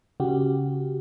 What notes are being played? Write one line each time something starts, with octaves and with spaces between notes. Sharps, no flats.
C#3 F#4 G4